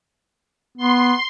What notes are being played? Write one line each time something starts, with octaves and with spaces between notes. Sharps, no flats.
B3 C6